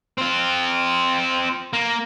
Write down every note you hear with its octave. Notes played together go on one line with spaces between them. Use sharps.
C4 F4
A#3